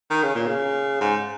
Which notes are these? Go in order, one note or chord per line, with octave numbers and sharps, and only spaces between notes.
D#3
C#3
A#2
C#3
G#2